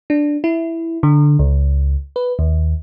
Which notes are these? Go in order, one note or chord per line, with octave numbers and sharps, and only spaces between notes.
D4
E4
D3
C#2
B4
D#2